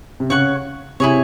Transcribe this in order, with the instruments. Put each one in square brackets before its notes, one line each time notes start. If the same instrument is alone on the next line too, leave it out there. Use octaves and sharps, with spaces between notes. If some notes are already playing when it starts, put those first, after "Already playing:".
[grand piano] C3
[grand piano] C#3 [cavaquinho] C#5 F#5 C#6
[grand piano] C3 [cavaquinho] E4 G#4 C#5